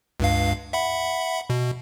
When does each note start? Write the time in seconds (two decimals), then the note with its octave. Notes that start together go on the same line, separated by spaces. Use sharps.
0.20 C#2 G2 F5
0.73 E5 F#5 B5
1.50 B2